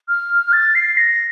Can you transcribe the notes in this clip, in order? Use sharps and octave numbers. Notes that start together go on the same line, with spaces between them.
F6
A6
C7
A#6